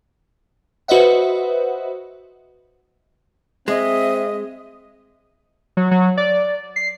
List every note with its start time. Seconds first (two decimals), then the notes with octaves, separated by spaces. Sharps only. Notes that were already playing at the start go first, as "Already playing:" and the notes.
0.88 F#4 B4 C5 D#5 E5 F#5
3.68 G#3 C4 D#5 E5
5.77 F#3
5.91 F#3
6.17 D5
6.76 C7